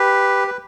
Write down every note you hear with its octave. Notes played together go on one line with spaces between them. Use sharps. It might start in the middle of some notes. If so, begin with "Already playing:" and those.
Already playing: G4 B4
B4